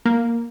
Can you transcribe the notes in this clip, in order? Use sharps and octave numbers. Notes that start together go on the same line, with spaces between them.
A#3